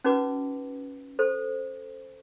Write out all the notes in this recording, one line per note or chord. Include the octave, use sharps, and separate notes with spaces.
C#4 D#4 F#4 B4 D6
A4 C5